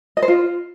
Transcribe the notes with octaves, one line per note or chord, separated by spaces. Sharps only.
D#5
C5
F4